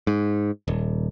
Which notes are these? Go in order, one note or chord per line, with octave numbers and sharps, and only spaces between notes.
G#2
D#1